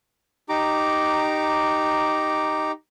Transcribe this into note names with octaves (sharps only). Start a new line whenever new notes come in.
D#4 G4 A#5 D6